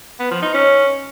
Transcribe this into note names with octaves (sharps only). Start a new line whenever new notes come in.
B3
F3
D#4
C#4